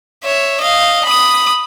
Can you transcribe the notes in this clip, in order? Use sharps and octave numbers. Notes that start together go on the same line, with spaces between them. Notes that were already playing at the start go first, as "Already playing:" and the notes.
C#5 E5
D#5 F5
B5 D#6